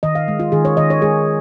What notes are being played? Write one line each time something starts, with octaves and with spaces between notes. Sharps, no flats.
D#3 D#5
F5
G#3
F4
D#3 G#4
C#5
D#3 D#5
C#5
G#3 G#4